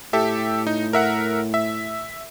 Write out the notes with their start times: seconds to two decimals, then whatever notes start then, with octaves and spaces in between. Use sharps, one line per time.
0.13 A2 G4 A4 E5
0.67 D#4
0.93 A#4 E5 F#5
1.54 E5